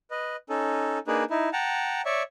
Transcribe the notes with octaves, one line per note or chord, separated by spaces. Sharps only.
B4 D#5
C#4 D#4 A4
A#3 D4 D#4 G#4 B4
D#4 E4
F#5 G5 A5 A#5
C#5 D5 E5 C#6